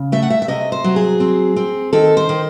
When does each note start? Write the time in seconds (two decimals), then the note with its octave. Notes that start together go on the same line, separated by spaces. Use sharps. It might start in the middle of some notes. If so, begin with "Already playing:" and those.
Already playing: C#3
0.12 A3 E5
0.22 F#5
0.30 E5
0.42 E5
0.48 C3 D#5
0.72 C5
0.84 F#3
0.96 G#4
1.20 C4
1.56 C4
1.93 D#3 A4
2.17 C5
2.29 D#3